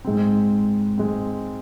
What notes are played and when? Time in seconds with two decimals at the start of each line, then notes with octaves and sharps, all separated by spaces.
0.05 G#2 G#3 C4
0.98 G#2 G#3 C4